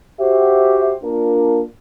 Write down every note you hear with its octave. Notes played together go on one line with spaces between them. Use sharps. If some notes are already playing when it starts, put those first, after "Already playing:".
F#4 G4 C5 E5
A#3 D4 F4 A#4